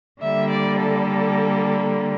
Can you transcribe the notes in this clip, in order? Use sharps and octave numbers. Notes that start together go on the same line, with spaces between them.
D3 G3 A#3 E5
D5
A4